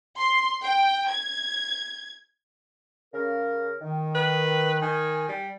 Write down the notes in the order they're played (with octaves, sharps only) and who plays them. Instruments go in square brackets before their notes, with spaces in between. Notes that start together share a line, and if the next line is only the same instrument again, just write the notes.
[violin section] C6
G5
G#6
[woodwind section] C#3 A#4
D#3
[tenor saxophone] B4
[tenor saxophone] D#3 [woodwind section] G#5
[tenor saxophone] G3